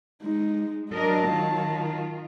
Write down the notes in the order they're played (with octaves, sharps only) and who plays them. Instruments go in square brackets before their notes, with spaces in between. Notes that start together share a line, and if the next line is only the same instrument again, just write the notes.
[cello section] G#3 [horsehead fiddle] D#4
[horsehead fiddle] F#3 A5 [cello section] D4 A#4 D#5
[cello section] D#3 F4